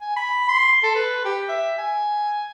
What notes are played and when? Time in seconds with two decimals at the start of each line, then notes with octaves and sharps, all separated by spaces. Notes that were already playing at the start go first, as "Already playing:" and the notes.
0.01 G#5
0.16 B5
0.49 C6
0.83 A4
0.95 B4
1.25 G4
1.49 E5
1.78 G#5